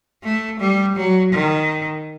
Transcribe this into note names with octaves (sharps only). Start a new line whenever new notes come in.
A3
G3
F#3
D#3